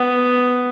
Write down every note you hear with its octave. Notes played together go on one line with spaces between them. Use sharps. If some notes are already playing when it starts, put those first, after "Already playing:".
Already playing: B3